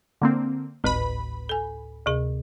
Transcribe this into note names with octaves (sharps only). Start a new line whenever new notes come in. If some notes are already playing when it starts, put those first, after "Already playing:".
D3 A#3 C4
G#1 D2 A2 B4 B5
A4 G#5
D2 C3 G#4